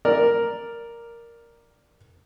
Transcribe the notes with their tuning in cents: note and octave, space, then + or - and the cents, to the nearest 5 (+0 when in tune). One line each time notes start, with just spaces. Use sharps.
A#4 +0 D5 +0